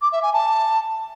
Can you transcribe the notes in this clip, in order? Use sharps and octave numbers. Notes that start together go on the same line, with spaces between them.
D6
E5
G#5
A5